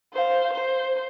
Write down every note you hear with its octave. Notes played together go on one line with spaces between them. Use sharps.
C5 F5
C5